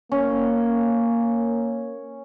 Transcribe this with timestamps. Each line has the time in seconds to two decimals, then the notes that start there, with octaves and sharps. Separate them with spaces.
0.12 A#3 C#4